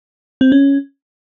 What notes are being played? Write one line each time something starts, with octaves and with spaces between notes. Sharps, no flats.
C4
C#4